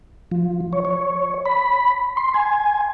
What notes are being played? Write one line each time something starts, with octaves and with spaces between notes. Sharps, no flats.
F3
C#5
C#5
B5
C6
G#5